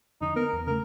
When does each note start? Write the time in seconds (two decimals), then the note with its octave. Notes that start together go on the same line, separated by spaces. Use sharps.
0.21 F2 D3 D#4
0.36 B3 A#4
0.53 E2
0.67 C#3 A3 A#4